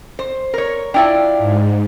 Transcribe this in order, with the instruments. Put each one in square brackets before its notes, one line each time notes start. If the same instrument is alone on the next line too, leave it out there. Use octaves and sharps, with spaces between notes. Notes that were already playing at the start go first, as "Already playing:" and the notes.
[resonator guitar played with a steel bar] C5
A#4 C#5
[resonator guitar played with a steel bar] D4 E4 F4 [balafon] G5
[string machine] G#2